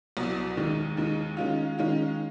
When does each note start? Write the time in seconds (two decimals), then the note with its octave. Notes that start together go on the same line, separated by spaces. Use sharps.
0.17 C2 B2 F#3
0.57 D#2 D#3 G#3
0.97 D#2 D#3 G#3
1.37 D#3 G#3 C#4 F4
1.78 D#3 G#3 C#4 F4